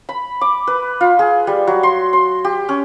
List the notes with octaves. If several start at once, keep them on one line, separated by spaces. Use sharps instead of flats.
B5
D6
B4
F4
G#4
G3
F#3
C6
C6
G4
C#4